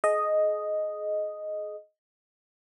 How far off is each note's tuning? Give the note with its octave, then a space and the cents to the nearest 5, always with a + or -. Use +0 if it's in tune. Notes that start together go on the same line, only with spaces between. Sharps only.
G#4 +35 D#5 +0